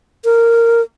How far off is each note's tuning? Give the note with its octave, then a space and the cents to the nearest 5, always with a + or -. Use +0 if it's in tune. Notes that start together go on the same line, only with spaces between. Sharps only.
A#4 -10